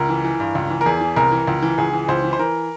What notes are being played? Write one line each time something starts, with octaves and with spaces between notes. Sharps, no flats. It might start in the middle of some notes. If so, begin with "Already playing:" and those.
Already playing: C#2 A#4
E3
E3
G2
C#2
E3
A#4
E2 G#4
E3
C2 A#4
E3
C#2
E3
C#2 G#4
E3
C#2 C5
E3
C5
E3 A#4